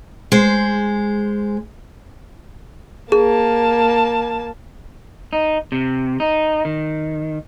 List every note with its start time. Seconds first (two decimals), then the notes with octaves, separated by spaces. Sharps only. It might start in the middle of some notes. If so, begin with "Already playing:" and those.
0.32 G#3 C5
3.12 A#3 G#4 A5
5.33 D#4
5.72 C3
6.20 D#4
6.65 D#3